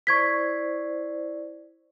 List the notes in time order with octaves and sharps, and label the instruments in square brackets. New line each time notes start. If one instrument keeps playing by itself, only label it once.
[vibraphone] E4 C5 D5 [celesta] C#6 G#6 B6